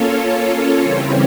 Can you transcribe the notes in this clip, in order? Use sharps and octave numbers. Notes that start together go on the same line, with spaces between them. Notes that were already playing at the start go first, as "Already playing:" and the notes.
Already playing: A#3 C#4 F4 A4 C#5
C#3 E3 G3 C4